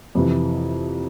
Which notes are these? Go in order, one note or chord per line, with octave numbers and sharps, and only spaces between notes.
F2 C3 E3